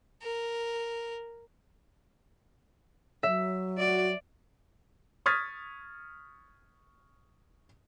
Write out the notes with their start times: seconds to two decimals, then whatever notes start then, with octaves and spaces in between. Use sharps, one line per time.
0.22 A#4
3.23 F#3 E5
3.78 F#4 D5
5.26 C#6 D#6 F6 G#6 A6 B6